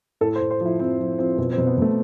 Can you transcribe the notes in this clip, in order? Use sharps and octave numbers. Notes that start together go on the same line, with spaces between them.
A2 A4
C5
A2
C5
F3
E4
F3 C4
F3
F3 C4
B2 C4
C4
B2
B3
B2 A3